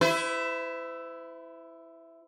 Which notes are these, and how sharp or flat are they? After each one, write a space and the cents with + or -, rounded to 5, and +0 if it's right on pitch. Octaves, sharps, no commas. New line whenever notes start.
E4 +5 C5 -45